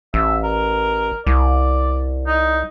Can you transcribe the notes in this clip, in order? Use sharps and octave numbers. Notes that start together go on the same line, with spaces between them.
A1 E5
A#4
C2 D5
D#4